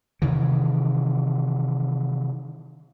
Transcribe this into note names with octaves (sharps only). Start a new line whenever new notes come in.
C3 D#3 E3